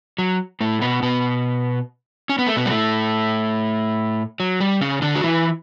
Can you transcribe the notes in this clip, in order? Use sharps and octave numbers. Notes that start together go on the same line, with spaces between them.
F#3
A2 A3
B2 B3
B2 B3
C#4
B3
A3
B2 B3
G3
A2 A3
F#3
G3
C#3 C#4
D3 D4
F#4
E3 E4